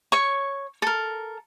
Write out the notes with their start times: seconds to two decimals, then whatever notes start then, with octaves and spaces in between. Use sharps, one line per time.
0.12 C#5 C#6
0.82 A4 A#4